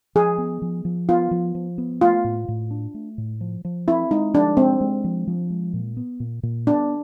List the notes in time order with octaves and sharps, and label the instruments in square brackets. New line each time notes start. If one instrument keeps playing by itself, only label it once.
[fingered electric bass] F3 [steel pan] G#4
[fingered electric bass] B3
F3
F3
[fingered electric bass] B3 [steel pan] F4
[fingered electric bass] F3
F3
B3
[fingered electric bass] A3 [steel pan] F4
[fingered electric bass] A2
A2
D4
A3
A2
F3
F3
[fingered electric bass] C4 [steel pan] E4
[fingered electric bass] G#3 [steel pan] D#4
[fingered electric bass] F3 [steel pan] D4
[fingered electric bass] G#3 [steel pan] C4
[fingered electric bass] G#3
F3
F3
G#3
A#2
B3
A#2
A#2
[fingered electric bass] B3 [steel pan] D4